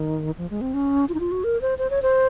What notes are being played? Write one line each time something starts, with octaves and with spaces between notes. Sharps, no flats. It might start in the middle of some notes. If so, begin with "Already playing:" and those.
Already playing: D#3
F3
G#3
C4
C#4
F4
D#4
F4
F#4
A#4
C5
C5
C#5
C5